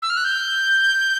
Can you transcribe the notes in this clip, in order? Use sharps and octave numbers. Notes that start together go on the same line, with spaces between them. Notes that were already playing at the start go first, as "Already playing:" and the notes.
E6
F6
F#6
G6